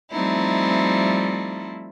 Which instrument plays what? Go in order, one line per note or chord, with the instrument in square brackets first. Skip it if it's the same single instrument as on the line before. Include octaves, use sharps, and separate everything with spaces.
[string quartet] F3 G3 A3 C4 D#4 E4